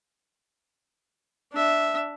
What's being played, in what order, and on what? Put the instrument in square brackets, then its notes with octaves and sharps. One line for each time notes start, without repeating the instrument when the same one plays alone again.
[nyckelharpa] D4 E5